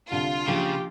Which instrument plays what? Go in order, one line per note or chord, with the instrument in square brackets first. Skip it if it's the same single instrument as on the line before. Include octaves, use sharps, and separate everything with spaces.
[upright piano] C2 D3 [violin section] F4
[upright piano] A#1 F3 [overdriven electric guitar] C#3 [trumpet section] G4